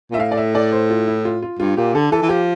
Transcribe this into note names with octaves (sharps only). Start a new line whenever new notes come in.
A#2 E5
A2 F5
D5
E5
D5
C5
F4
E4
F4
F4
G2 F4
A#2 G4
D3 A4
E3 A4
E3
F3 G4